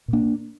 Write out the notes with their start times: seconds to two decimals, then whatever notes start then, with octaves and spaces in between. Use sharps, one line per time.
0.08 A#2 A#3 D4